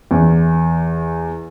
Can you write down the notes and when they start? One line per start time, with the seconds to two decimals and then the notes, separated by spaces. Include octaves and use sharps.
0.11 E2